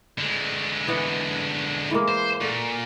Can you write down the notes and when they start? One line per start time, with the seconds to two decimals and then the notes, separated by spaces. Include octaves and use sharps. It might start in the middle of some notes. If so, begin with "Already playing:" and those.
0.18 D3 G#3
0.87 E3 B3 F#5
1.91 E3 G#3 A#3
2.08 C5
2.41 A#2 F#4 A4